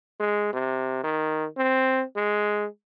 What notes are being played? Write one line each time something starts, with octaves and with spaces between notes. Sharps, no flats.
G#3
C3
D#3
C4
G#3